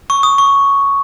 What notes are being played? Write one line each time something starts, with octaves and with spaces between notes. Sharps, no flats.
C#6
D#6
C#6